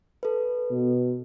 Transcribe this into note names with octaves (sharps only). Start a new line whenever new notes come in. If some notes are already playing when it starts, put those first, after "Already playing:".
A4 B4
B2